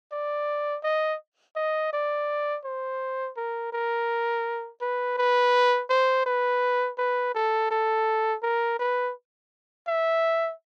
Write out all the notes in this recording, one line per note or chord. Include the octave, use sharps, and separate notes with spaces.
D5
D#5
D#5
D5
C5
A#4
A#4
B4
B4
C5
B4
B4
A4
A4
A#4
B4
E5